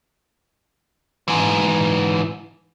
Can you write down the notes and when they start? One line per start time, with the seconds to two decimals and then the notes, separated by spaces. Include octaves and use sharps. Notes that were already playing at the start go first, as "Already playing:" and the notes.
1.28 G#2 E3